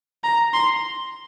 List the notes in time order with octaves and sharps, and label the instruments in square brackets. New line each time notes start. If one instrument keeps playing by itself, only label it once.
[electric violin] A#5
C6